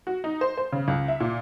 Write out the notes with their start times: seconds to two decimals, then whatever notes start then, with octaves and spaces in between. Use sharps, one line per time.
0.07 F#4
0.24 D#4
0.41 C5
0.57 C5
0.72 C#3
0.88 C#2
1.08 E5
1.20 A#2